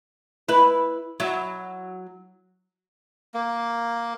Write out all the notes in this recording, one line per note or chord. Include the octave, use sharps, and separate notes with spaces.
E4 B4
F#3 E4
A#3